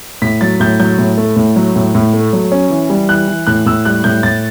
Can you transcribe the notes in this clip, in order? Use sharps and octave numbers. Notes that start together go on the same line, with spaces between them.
A2 B6
F#3 A6
A2 G6
F#3 G6
A2
A3
A2
F#3
A2
A2
A3
F#3
C#4
E3
G3
E3 F#6
E3
A2 F#6
A2 E6
G3 F#6
A2 G6
A2 A6